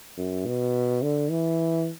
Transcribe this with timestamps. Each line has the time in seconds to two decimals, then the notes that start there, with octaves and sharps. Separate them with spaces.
0.17 F#2
0.46 B2
1.02 D3
1.30 E3